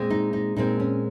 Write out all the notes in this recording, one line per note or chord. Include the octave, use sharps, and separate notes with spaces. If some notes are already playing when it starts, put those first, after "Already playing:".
Already playing: A#2 G#3 C4
D#4
D#4
A#2 G#3 C4 D#4
C#4